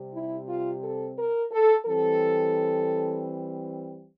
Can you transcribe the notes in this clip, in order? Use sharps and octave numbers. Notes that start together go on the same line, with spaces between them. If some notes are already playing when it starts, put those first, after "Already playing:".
Already playing: C3 G3 C4
E4
F4
A4
A#4
A4
E3 G3 C4 A4